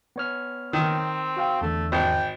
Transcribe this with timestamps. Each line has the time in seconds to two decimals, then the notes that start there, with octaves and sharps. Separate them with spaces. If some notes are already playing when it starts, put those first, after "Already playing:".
0.16 B3 C#5 F6
0.73 D#3 C4
1.37 F#4 F5 G5
1.61 E2 D3 A3
1.92 G#1 G5